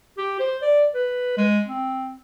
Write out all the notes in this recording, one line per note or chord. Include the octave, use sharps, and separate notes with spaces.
G4
C5
D5
B4
G#3
C4